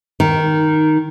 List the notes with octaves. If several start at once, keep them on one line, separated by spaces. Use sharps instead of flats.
D#3